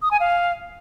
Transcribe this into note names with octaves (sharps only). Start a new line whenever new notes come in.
D#6
G#5
F5